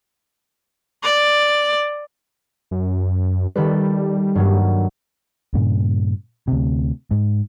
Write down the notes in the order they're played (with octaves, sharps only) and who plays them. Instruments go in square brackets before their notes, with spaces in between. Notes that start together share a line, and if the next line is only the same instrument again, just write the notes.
[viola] D5
[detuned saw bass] F#2
[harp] D#3 A4 B4 [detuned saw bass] G3
[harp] G2 F#3 A#3
[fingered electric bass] G2 A#2 C#3
D2 C3
G#2